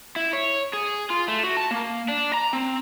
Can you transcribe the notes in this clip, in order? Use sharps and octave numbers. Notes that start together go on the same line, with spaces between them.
E4
C#5
G#4
F4
A3
F#4
A5
A#3
D4
A#5
C4